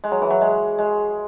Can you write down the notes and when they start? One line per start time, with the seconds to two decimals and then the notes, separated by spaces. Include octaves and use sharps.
0.04 G#3
0.12 F#3
0.22 E3
0.30 F#3
0.41 G#3
0.78 G#3